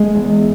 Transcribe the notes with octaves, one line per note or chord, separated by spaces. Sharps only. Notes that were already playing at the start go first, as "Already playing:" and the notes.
Already playing: G#3 G#4
E2